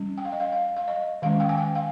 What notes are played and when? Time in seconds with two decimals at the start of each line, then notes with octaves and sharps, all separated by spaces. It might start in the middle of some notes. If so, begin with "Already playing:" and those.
Already playing: G3 C#4
0.18 G5
0.25 F5
0.32 D#5
0.40 F5
0.52 F5
0.76 F5
0.88 D#5
1.22 D#3 G#3 C#4 F5
1.40 G5
1.49 G#5
1.58 G5
1.75 F5